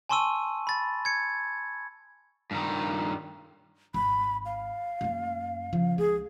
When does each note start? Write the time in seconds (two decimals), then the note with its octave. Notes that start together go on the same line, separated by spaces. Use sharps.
0.09 G#5 A5 C6 C#6 E6 D#7
0.67 B5 A6
1.05 G#6 C#7
2.51 G2 D#3
3.94 G#1 B5
4.45 F5
5.01 F#2 A#3
5.73 C#3 F3
5.98 C#2 G#4